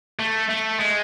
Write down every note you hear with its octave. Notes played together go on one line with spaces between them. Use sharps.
A3
A3
G#3